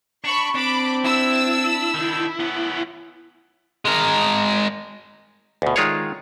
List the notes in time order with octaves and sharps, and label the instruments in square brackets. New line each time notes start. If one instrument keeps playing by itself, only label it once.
[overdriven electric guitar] D4 [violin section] B5 C#6
[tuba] C4 [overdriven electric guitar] D4 [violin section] B5 D6
[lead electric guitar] E4 [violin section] E6
[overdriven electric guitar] D#3 D4
B3 C#4
[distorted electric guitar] G#3 A#4
[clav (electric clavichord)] D2 B2
D#3 G#3 F4 G#4 C#5